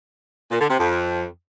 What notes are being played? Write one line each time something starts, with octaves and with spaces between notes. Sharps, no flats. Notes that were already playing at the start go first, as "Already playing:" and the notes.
A#2
D3
C3
F2